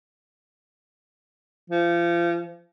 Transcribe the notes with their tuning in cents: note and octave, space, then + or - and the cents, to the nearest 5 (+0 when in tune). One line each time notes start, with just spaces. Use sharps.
F3 -30